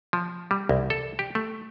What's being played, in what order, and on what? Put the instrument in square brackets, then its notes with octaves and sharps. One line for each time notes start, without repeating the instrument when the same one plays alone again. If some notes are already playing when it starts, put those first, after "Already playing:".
[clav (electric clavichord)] F3
G3
C2
A4
G4
A3